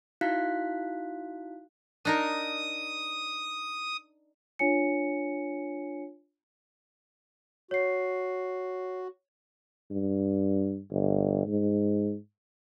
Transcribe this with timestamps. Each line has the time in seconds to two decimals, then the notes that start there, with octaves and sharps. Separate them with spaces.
0.21 D#4 E4 F#4 F5 F#6 B6
2.05 D4 D#4 A#4 D#6
4.59 D4 F4 C#5 G#5 C#7
7.71 F#4 C#5 C7
9.91 G2
10.91 G1
11.46 G#2